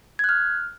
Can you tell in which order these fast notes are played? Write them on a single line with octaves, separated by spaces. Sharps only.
G#6 F#6 F6